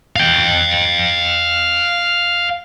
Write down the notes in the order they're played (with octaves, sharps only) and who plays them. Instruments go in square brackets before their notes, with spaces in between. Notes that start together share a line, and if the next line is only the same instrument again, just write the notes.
[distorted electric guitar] F5 G5